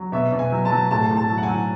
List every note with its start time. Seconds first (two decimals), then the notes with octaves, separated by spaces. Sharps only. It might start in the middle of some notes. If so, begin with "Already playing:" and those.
Already playing: F#3
0.12 B2 E5
0.32 B2
0.39 G#5
0.52 F#3
0.65 A5
0.71 F#3
0.91 A2 A5
1.11 A2
1.17 A5
1.30 F#3
1.38 F#5
1.43 G#5
1.48 F#3